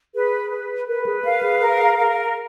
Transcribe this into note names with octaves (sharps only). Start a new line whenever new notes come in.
G#4 B4
B4
A#4 B4
G#4
A#4 F5
G#4
A#4
A#4